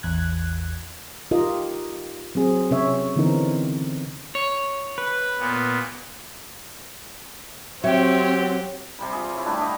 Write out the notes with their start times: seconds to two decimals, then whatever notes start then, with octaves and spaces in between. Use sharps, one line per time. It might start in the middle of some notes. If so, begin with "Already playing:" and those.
0.03 A1 E2 F#6 G#6
1.31 D#4 F4 G4 A#4 D#5
2.35 F#3 C4 G#4
2.71 C3 C#4 C#5 E5
3.16 D3 E3 B3 C4 D#4 A#4
4.35 C#5
4.98 B4
5.39 A#2 B3
7.84 F#3 C4 G4 C#5 E5 G5
8.99 C3 G3 B5
9.12 F4 G#4
9.34 E4 C#5
9.46 G3 A3 D4 G4
9.60 G4 D#5 F5 F#5